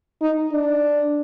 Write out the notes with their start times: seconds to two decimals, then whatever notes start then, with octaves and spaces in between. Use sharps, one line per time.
0.21 D#4
0.52 D4